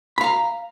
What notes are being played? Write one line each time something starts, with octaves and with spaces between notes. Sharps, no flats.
F5 A#5 B5